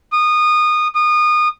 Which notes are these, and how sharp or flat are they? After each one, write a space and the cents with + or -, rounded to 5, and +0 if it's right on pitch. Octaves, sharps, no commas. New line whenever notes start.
D#6 -25
D#6 -30